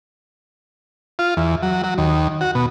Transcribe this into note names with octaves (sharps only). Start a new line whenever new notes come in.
F4
E2
F#3
F#3
D#2
F#4
B2